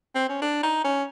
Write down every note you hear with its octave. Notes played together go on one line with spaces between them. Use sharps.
C4
C#4
D4
D#4
C#4